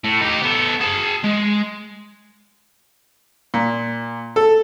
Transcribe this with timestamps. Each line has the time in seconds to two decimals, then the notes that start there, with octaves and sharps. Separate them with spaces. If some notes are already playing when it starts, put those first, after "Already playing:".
0.04 A2
0.21 D#4 G4
0.42 B3 A4
0.81 G#4 A5
1.24 G#3
3.54 A#2
4.36 A4